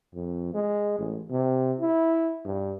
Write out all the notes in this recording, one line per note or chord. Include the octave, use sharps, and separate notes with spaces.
F2
G#3
A1
C3
E4
G2